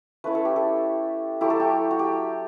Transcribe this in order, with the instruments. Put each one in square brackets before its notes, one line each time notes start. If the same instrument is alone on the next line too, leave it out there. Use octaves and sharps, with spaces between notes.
[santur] A3 C#4 E4 B4
A4
G4
A4
F#3 A3 E4 G4
A4
G4
F#4
G4